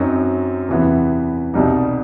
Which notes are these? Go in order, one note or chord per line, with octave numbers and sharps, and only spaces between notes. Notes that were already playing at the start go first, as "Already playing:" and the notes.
Already playing: F#2 F#3 C4 D#4
E2 C3 E3 B3
C2 B2 G3 D#4